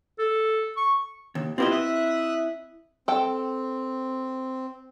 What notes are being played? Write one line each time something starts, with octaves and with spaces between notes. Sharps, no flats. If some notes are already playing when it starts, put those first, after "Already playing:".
A4
C#6
D#2
B3 C4 E4 F4 G4 D#5
E5 D#6 F#6
C4 A4 G5